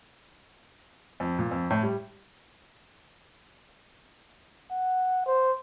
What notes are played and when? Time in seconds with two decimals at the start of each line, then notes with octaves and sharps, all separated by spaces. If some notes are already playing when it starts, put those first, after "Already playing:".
1.20 F2
1.39 A#2
1.51 F2
1.70 A2
1.83 G3
4.71 F#5
5.26 C5